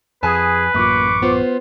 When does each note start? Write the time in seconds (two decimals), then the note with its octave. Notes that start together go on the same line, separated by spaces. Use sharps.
0.23 F2 G#4 B4 G#5 A5
0.74 A1 F#2 A#3 F4 C#6 D6
1.22 B3 F4 C5